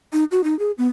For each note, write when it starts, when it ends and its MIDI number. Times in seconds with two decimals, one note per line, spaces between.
0.13 0.24 63
0.31 0.43 66
0.44 0.57 63
0.59 0.71 68
0.78 0.87 59